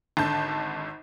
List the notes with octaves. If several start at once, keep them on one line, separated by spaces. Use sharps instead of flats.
G#1 D3 A5 G6